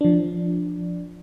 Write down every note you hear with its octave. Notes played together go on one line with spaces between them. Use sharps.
F3 D4